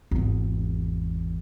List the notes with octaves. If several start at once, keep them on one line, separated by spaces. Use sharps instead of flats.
G#1 E2